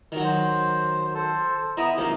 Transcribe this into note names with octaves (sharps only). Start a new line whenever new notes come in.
D#3 F#3
C5
A4 C5
B3 E4 D#5 A#5
C3 F3 A#3 D#4